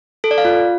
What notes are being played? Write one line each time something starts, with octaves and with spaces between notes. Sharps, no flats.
A4
D5
F5
F4